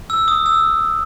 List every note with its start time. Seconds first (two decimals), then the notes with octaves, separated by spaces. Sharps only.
0.10 E6
0.28 D#6
0.46 E6